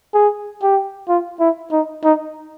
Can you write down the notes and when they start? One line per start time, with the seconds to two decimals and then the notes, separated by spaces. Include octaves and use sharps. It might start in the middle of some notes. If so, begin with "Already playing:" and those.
0.14 G#4
0.62 G4
1.09 F4
1.40 E4
1.72 D#4
2.04 D#4